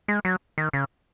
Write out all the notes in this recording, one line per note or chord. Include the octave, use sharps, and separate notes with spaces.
G#3
F#3
D#3
C#3